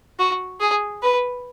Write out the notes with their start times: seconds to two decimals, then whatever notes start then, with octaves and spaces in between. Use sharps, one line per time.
0.19 F#4
0.60 G#4
1.03 B4